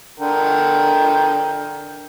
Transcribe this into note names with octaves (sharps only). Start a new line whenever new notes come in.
D3 A#4 G5